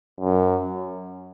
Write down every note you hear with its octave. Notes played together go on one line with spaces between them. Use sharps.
F#2